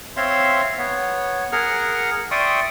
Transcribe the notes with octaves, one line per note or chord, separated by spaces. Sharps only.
C4 C#5 E5 F5 C6
B3 C#5
G#4 A#4 F#5 F6
D5 E5 G5 C6 C#6 D#6